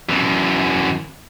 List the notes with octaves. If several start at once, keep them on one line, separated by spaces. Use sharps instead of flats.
F#2 E3